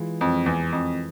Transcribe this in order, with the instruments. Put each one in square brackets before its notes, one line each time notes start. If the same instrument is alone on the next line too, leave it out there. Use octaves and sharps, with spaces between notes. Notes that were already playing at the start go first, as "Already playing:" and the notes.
Already playing: [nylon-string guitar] E3 G#3 F4
[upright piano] F2
E2
F2